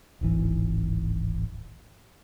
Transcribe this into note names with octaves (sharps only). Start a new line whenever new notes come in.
D1 G#1 E3